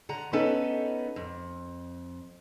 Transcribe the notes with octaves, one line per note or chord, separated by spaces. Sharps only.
D3 F#5 A#5
B3 C#4 D#4 A4 B4
F2